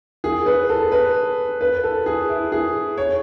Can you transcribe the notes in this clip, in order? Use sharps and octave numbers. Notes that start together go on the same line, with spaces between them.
G#4
B4
A4
B4
B4
A4
G#4
E4
G#4
C#5